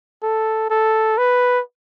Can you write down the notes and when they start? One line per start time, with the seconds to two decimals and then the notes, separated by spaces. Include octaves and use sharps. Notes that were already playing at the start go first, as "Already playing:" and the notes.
0.22 A4
0.70 A4
1.18 B4